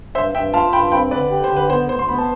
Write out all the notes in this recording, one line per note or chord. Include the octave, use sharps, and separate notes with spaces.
G2 C5 E5
G2 E5 G5
F4 F5 A5
G2 G5 B5
C4 G5 B5
D3 B4 D5
G4
C5
D3
B4
B3 C5
D2 C5
C6
B3 B5
A5